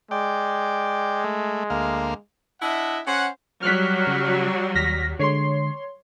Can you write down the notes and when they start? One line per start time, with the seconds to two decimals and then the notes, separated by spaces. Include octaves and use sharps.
0.11 G#3 D5 G5
1.24 A3
1.70 D2 A#3 F5
2.61 D4 E4 D#5 E5 F#5
3.06 C#4 C5 F#5
3.62 F#3 G3 F6 F#6 B6
4.07 C#3
4.75 D#2 F6 A#6 B6
5.19 D3 G#3 C#5 C6 C7